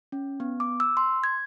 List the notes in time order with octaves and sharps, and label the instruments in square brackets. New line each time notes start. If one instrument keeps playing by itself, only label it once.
[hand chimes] C#4
B3
D6
E6
C6
G#6